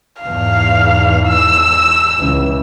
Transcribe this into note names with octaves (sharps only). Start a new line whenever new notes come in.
E2 G#2 E3 F5
E6
C#2 E3